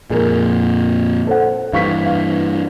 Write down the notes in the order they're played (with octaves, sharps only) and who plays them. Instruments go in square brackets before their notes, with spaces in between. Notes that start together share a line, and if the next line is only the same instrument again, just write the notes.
[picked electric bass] F2 A#2 [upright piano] G#4 A#4
[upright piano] A4 C5 F#5
[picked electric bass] G2 E3 [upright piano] F5 C#6 B6
[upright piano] F5